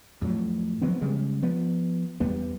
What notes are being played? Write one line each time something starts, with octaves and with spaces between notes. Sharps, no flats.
F2 A2 F#3
F3 F#3 B3 C4
C#3 G3 G#3
F3 B3
E2 G3 B3